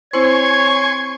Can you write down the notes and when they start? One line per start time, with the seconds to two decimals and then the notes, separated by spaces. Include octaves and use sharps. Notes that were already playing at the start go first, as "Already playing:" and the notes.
0.13 C4 E4 C5 C#5 G#5 C6 C#6 G#6